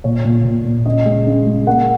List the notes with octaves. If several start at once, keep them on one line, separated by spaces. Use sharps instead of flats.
A#2 C#5
A#2
A#2
A#2
C#3 D#5
G#3
C#3
G#3
A#3 F#5